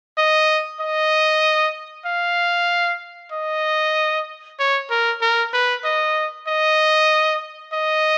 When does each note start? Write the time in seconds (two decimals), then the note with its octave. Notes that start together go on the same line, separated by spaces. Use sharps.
0.18 D#5
0.81 D#5
2.06 F5
3.32 D#5
4.59 C#5
4.91 A#4
5.22 A#4
5.53 B4
5.85 D#5
6.48 D#5
7.73 D#5